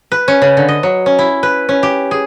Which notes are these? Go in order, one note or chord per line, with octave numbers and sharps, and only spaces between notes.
B4
C#4
C#3
D3
D#5
F#3
C#4
E4
B4
C#4
G4
G#4